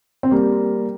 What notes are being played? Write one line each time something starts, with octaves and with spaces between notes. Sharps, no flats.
C4
G3 A#3